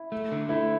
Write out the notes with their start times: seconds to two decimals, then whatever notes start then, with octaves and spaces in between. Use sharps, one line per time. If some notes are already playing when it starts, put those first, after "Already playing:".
Already playing: E4
0.12 A3
0.32 D3
0.49 A3 E4